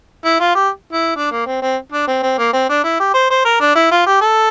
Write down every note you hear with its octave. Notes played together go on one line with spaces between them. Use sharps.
E4
F4
G4
E4
D4
A#3
C4
C4
D4
C4
C4
A#3
C4
D4
E4
G4
C5
C5
A#4
D4
E4
F4
G4
A4